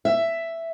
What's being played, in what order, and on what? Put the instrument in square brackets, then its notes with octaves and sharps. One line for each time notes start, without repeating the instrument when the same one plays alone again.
[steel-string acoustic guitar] E5